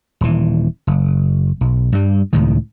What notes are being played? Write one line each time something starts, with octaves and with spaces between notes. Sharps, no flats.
D#1 E3
F#1
B1
G2 G3
C#2 A2 D#3